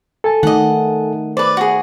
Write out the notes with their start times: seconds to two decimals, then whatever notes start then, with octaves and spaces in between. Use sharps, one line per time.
0.24 A4 G#5 A5
0.43 D#3 A3 D#5 F#5
1.37 B4 C5 D5
1.57 F#4 G#4